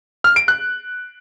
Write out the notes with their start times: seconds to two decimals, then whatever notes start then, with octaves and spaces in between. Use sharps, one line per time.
0.24 F6
0.36 D7
0.48 F#6